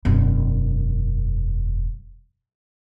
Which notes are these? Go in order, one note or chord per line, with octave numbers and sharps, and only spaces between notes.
E1 F#2